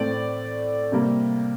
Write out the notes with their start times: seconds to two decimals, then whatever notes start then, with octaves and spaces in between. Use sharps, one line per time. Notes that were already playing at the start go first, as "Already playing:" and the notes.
Already playing: A2 A3 C4 D5
0.92 C3 G3 A#3